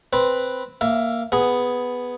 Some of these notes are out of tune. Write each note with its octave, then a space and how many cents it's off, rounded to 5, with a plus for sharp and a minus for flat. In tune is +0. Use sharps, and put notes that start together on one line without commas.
C4 +0 B4 +0
A#3 +0 E5 +15
B3 +0 G#4 +0